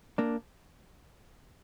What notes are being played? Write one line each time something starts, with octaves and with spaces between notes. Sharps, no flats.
A#3 D4